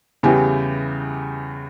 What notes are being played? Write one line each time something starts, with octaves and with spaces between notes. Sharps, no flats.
E2 C#3 E3 G3 G4